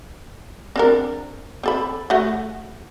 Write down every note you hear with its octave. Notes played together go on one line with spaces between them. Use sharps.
C4 D4 A#4
C4 A4 B5
A3 F#4